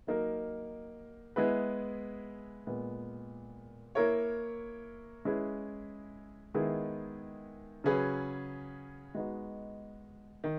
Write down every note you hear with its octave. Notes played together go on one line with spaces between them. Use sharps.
F#3 A#3 D#4 A#4
G#3 B3 E4 G#4 B4
A#2 G#3 B3
A#3 E4 A#4 C#5
G#3 C#4 E4 G#4 B4
D#3 G#3 B3 E4 G#4
C#3 F#3 C#4 G#4 B4
G#3 B3 D#4 F#4
D#3